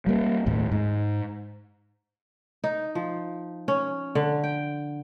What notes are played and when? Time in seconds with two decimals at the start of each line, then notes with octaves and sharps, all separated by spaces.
0.07 G3 A#3
0.46 D#2 A2
0.72 G#2
2.64 D#4
2.95 F3
3.68 C#4
4.15 D3
4.44 G5